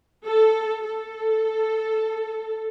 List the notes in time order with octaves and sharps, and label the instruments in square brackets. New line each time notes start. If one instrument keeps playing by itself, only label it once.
[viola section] A4
A4